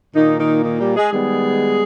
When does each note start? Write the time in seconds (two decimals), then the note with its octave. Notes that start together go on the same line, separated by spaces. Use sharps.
0.15 A#2 D#3 A#3 D#4
0.39 D#3 D#4
0.64 D#3 D#4
0.79 G3 G4
0.96 G#3 G#4
1.11 D#3 G3 G#3 B3 G#4